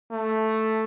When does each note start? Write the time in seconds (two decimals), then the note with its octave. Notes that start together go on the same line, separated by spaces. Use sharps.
0.12 A3